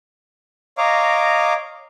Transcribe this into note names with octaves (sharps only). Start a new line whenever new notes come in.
C#5 D#5 F5 A#5 D6